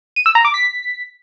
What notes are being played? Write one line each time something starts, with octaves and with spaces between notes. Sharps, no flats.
D#7
E6
A#5
D6
B6